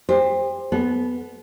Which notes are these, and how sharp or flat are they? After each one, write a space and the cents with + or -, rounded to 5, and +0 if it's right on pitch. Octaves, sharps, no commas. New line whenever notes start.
G4 +40 C5 +5
B3 +0 A4 -35